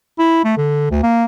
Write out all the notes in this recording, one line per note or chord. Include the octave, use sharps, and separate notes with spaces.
E4
A3
D3
D2
A#3